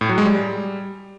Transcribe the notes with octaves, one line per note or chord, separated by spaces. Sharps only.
A2
F#3
G#3
G3